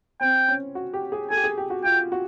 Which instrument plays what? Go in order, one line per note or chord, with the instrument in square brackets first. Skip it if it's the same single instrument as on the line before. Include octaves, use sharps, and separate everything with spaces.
[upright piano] C4 [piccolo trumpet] G5
[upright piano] C#4
F#4
G4
G#4
[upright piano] A4 [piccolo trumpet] G#5
[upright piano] G4
G#4
G4
F#4
[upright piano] F4 [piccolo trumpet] G5
[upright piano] F#4